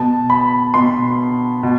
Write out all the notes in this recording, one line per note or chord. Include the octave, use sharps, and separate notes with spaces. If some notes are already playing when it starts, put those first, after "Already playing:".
Already playing: B2 B3 A5
B5
B2 B3 C6
B2